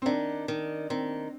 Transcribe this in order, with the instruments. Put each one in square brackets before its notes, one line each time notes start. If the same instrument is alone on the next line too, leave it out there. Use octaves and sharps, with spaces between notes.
[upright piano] C4
[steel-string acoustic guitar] D#3 [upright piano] D4
[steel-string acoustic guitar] D#3
[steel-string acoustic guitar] D#3 [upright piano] C4